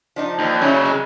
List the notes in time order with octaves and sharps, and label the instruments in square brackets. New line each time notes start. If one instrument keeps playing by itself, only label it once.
[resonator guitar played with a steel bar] F3 D4 D#4
[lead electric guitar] D#2
[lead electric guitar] C#3 F#3 [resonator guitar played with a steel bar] C#4 E4
[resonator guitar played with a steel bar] G#3